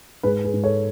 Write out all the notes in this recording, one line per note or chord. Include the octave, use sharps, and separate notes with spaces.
G#2 G#4 B4
G#4 B4
G#2
A4 C#5